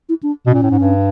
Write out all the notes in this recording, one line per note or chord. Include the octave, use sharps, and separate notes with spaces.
E4
D4
B2 C4
A#2 C#4
A2
G#2
G2